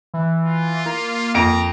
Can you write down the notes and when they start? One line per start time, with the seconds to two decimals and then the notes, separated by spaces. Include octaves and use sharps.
0.14 E3
0.45 F4
0.86 A#3
1.35 F2 A#5 D7